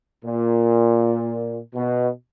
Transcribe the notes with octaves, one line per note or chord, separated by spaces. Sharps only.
A#2
B2